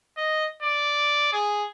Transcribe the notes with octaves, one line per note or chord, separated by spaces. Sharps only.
D#5
D5
G#4